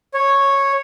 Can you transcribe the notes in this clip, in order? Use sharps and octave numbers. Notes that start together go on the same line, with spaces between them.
C#5